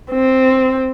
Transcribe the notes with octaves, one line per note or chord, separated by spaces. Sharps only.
C4